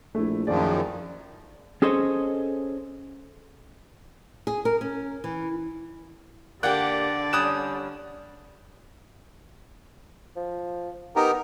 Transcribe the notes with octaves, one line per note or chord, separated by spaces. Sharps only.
A#1 A3 E4
F#2 D#3 F3 G#4 D5
C#4 G#4 A4 C5 C#5 D#5
G#4
A#4
C#4
E3
D3 A#3 G4 D5 F#5 F#6
G3 C#4 D#6 F#6 E7
F3
B3 D#4 G4 A#4